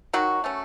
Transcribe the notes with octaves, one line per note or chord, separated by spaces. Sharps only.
D#3 F#3 F#4
A3 C#4